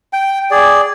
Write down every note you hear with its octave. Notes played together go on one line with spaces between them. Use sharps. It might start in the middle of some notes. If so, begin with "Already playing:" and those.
G5
G#4 D5